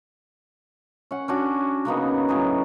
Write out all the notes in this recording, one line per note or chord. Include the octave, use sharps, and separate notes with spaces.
C#4 F#5
C#4 D4 F#4
C#3 A#3 B3 D#4
A2 F#3 G#4